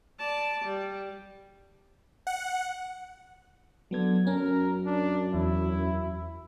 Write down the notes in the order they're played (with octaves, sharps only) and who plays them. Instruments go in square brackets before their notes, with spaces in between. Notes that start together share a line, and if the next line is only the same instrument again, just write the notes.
[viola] D5 A5
G3
[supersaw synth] F#5
[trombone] D3 [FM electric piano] F#3 B3 G#6
[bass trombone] F#2 [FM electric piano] C#4 [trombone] A#4
[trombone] D4
[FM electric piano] E2 [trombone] E4